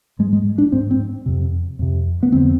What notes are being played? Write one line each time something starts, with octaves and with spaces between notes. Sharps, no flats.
G#2 G#3
G#3
D4
G#2 C4
C4
F2 C3
F2 C3
B3
F2 D3 C4